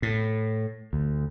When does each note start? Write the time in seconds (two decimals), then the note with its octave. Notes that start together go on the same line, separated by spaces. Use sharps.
0.02 A2
0.93 D2